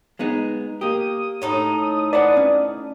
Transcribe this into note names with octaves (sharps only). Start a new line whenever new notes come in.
G#3 B3 D#4
A#3 G4 D#6
A2 D#4 A4
B4 C5 D5 F#5 A5
C#4